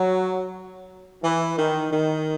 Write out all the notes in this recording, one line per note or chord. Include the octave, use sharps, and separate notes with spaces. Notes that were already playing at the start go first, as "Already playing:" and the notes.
Already playing: F#3
E3
D#3
D#3